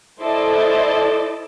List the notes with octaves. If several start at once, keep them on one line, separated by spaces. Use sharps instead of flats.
E4 A4 C5 D5 D#5 A5